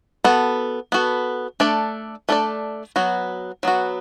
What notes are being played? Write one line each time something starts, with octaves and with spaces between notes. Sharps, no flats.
B3 F#4 A4
B3 F#4 A4
A3 D4 A4 D5
A3 D4 A4 D5
F#3 B3 F#4
F#3 B3 F#4